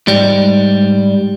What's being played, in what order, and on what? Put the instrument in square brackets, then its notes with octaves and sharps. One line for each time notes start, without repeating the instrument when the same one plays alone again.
[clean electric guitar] G#2 G3